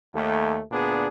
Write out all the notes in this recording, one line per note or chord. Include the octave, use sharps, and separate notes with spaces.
D#2 A3
D2 A#2 B3 D4 G#4